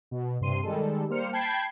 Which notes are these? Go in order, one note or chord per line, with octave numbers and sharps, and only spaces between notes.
B2
G2 C3 C6 D#7
D#3 G3 G#3 A4
G3 A#3 C5 F6 C#7
G5 A5 B5 G6 G#6 C7